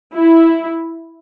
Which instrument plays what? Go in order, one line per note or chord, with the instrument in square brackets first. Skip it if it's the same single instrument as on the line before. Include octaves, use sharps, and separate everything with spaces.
[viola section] E4